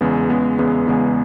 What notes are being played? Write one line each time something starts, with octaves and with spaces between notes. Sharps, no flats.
E2 C#3 G#3 B3
E2 C#3 G#3 B3
E2 C#3 G#3 B3
E2 C#3 G#3 B3